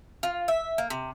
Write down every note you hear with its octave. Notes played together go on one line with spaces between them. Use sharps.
F4
E5
A#3
C3